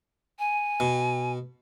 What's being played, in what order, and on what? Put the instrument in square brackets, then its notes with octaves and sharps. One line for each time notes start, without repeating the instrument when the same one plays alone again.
[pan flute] G#5
[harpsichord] B2